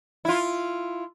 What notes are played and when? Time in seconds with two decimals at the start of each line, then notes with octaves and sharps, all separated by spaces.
0.25 E4 F4